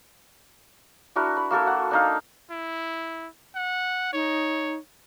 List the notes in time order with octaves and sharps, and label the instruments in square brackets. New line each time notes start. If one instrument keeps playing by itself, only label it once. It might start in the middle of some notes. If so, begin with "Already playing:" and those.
[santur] D4 E4 F#4 A#4
B5
A#3 F#4 A4 A#4
F#5
D4 D#4 F5
[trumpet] E4
F#5
[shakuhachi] D#4 [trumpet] C#5